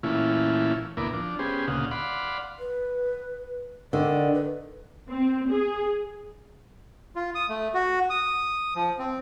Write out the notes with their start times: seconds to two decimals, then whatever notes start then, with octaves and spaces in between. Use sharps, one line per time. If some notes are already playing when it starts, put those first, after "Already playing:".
0.03 A#2 E3 A3 C#4 E4 F4
0.97 D2 A#2 B3 E4 A#4 D6
1.13 F3 D4
1.39 B3 C#4 G4 G#4 C5
1.68 D2 A#2 C#3 D#4 F5 F#5
1.91 D5 F5 F#5 B5 C6
2.58 B4
3.93 D3 D#3 D5
4.34 B4
5.10 C4
5.50 G#4
7.16 F4
7.35 D#6
7.49 A3
7.74 F#4
8.10 D#6
8.75 F3
8.99 C4